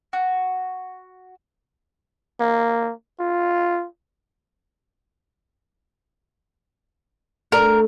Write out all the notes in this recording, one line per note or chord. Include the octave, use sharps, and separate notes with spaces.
F#4
A#3
F4
A3 D4 A#4